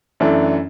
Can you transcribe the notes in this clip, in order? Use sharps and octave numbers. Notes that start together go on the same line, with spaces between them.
F#2 E3 A3 D4